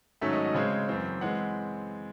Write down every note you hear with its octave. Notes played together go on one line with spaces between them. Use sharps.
G#2 D#3 F#3 A3 C#4 E5
D#5
D#5
C#3 G#3 C4 C#5
F#2 E3 C4
E3 G#3 C4 F#5